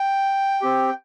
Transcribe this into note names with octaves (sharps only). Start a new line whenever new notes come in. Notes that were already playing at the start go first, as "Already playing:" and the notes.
Already playing: G5
C4 G4